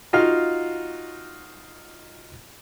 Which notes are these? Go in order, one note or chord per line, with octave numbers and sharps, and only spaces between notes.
D#4 F4 F#4 F5 F6